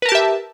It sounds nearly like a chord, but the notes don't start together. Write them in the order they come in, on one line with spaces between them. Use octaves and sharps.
B4 A#4 A5 G4 E5